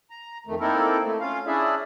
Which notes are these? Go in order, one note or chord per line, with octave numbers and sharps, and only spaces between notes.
A#5
F2 D#3 A3
A#3 C4 D#4 E4 A4 A#4
A3
C#4 F4 F5
C#4 D4 E4 G#4 D5 E5